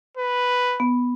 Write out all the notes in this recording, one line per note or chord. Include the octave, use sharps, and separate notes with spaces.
B4
B3